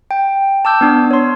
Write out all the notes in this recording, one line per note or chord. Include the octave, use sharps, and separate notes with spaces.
G5
A5 D6 E6 G6
B3 D4
C#5 C6